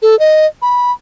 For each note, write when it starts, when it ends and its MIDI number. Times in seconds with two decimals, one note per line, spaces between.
0.02 0.18 69
0.19 0.46 75
0.62 0.92 83